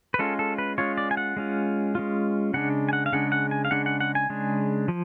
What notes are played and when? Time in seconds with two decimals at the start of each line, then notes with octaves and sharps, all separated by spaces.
0.14 B4
0.19 G#3 C#4 F4 A4
0.39 A4
0.58 B4
0.78 G#3 C#4 F4 C#5
0.98 D5
1.11 G#5
1.17 F#5
1.37 G#3 C#4 F4
1.95 G#3 C#4 F4
2.54 C#3 G#3 D4 F#5
2.89 G#5
2.93 F#5
3.06 F5
3.13 C#3 G#3 D4 F#5
3.32 F#5
3.51 G#5
3.65 F5
3.71 C#3 G#3 D4 F#5
3.86 F#5
4.00 F#5
4.15 G#5
4.30 C#3 G#3 D4
4.88 F3